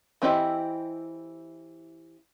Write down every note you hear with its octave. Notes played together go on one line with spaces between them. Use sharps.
E3 C4 E4 G4 D#5